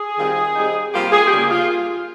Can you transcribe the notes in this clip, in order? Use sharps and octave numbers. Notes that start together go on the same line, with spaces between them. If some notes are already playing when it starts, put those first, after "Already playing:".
Already playing: G#4
D#3 G3 C4 F4
G3 C4 D#4
C3 G3 A#3 F4 G4
G#4
G4
C#3 G3 A#3 G#4
F4